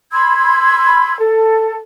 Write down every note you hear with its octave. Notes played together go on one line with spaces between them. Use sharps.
B5 C6 E6 G#6
A4